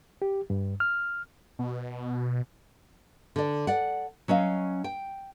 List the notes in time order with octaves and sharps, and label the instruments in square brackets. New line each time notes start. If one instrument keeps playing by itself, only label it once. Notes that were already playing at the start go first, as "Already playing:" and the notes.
[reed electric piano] G4
G2
F6
[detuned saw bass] B2
[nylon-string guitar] D3 D5
D5 F#5
F#3 C#4 D#5 F5
G5